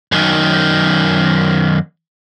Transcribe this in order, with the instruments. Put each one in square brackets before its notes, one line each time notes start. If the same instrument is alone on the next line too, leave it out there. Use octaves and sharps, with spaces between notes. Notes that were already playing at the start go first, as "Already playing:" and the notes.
[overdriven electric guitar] F#2 D#3